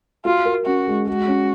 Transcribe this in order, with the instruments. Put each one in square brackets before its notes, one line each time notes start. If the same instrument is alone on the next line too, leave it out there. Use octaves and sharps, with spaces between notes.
[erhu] F4 [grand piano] F#4
[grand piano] A#4
[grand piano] C#4 [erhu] F#4
[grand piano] G#3
[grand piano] G#3 [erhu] F#4
[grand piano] C#4